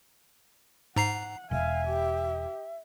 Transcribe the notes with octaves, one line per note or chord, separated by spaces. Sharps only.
G#2 F#5 A#5 C7
E1 E5 F5 G#5
G4